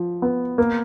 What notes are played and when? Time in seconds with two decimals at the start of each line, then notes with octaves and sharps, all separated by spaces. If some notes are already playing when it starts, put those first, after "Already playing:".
Already playing: F3
0.22 B3
0.58 A#3